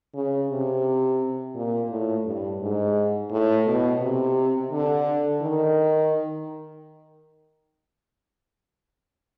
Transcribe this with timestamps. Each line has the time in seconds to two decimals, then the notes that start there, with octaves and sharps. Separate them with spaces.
0.14 C#3
0.50 C3
1.55 A#2
1.90 A2
2.25 G2
2.61 G#2
3.31 A2
3.66 B2
4.01 C3
4.72 D3
5.42 D#3